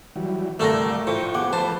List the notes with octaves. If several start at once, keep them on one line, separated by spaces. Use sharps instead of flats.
E3 F#3 G3
G1 C2 G3 A3 A4 A#4 D5 A#6
A2 F3 E4 G5 C#6
B3 G4 G#4 F#5 D6
F3 A4 B4 C5 A5